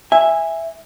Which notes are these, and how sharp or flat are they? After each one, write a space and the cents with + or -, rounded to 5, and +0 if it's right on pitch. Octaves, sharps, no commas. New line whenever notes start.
E5 +0 G#5 -15